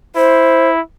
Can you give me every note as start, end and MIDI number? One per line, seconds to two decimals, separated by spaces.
0.16 0.80 64
0.16 0.70 72